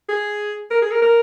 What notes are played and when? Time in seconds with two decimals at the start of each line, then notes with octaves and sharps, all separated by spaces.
0.09 G#4
0.71 A#4
0.82 G#4
0.91 A#4
1.02 A#4